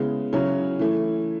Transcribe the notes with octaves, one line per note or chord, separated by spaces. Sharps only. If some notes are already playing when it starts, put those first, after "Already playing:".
Already playing: C#3 G#3 B3 E4
C#3 F#3 C#4 E4
E3 A3 E4